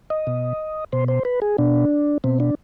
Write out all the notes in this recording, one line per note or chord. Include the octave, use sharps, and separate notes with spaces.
D#5
B2
B2 C5
C5
B4
G#4
B2 D4
B2 C4
D4